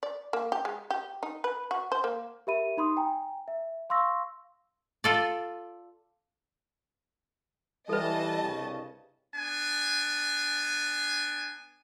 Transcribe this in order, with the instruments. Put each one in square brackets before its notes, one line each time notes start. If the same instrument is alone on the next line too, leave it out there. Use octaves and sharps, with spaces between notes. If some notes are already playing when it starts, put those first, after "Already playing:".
[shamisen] D5
A#3
G4
G#3
G4
D#4
B4
F#4
C5
A#3
[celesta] G4 A#4 E5 B5 D#7
D#4 B5 C6 D#6
G5 G#5 A#5
E5
F5 C6 C#6 E6 A#6
[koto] F4 A4 D5
[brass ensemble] E3 [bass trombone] G3 [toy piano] A4 B4 [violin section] D#5 A5
[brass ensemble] C2 G2 C#3
[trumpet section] B3 D4 G#5